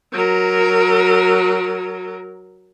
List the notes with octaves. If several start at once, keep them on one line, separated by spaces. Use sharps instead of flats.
F#3 A#4